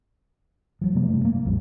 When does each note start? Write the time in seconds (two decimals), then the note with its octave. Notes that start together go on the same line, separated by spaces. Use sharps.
0.81 F3 F#3
0.95 C3 F3 A3 A#3
1.10 G2
1.25 A#3
1.45 A#1 F2 A2 G3